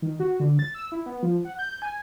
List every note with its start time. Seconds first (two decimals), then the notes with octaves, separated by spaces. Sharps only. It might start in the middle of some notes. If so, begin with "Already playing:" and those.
0.02 D#3
0.20 F#4
0.40 D3
0.59 A6
0.74 E6
0.92 E4
1.06 B3
1.23 F3
1.45 F#5
1.59 G6
1.82 G#5